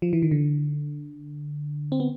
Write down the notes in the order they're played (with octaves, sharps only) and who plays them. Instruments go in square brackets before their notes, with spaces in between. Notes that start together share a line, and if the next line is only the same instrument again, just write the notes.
[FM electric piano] F3
E3
D#3
D3
C4
B3